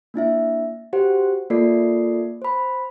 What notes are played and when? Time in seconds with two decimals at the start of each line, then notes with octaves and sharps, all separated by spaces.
0.14 A#3 D4 E4 E5
0.93 F#4 G4 C5 F#5
1.50 A#3 F4 A4 D5 C7
2.42 C5 B5